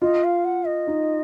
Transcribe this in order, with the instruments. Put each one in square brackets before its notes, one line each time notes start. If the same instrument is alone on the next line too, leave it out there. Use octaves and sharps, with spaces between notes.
[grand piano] F4 [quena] D#5
[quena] F5
F#5
D#5
[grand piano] D#4